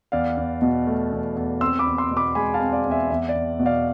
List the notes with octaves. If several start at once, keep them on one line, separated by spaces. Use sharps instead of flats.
E2 D5 F5
E2
B2
A3
E2
E2
C4 C6 E6
B5 D6
E2
C6 E6
B2
B5 D6
G#3 G#5 B5
F5 A5
C4
D5 F5
E2
E5 G#5
E2 E5
D5
E2
B2
D5 F5